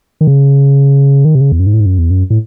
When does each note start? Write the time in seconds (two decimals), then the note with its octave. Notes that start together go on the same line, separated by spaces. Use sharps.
0.21 D#3
0.27 C#3
1.25 D#3
1.35 C3
1.41 C#3
1.52 E2
1.60 F#2
1.67 G#2
1.73 A2
1.80 G#2
1.86 F#2
1.98 E2
2.10 F#2
2.30 A2